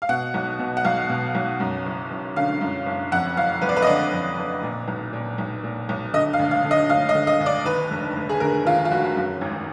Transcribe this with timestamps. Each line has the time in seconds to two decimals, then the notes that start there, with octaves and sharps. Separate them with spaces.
0.02 F5
0.09 B2 F#5
0.34 B1
0.59 B2
0.77 F#5
0.85 B1 F5
1.09 B2
1.35 B1
1.60 F#2
1.86 F#1
2.11 F#1
2.36 D3 F5
2.61 F#2
2.86 F#1
3.12 F2 F#5
3.37 F#1 F5
3.61 F#1 B4
3.69 D5
3.76 B4
3.82 D#5
3.87 D3 D5
4.12 F2
4.37 F#1
4.63 A#2
4.88 B1
5.13 A#2
5.38 B1
5.64 A#2
5.89 B1
6.13 D3 D#5
6.33 F5
6.39 D2
6.51 F5
6.64 D3
6.71 D#5
6.90 D2 F5
7.09 D#5
7.15 D3
7.27 D#5
7.40 D2
7.46 D5
7.65 D#2 B4
7.91 F1
8.16 F1
8.29 G#4
8.40 D3 A#4
8.66 D#2 F4
8.85 F4
8.91 F1 F#4
9.16 F#2
9.41 G#1